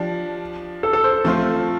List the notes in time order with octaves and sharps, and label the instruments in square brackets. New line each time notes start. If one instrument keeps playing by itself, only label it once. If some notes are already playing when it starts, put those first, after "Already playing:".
Already playing: [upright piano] F3 D4 G4 D5
[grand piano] A4
A4
C5
[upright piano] F3 C4 F4 C5 [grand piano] A3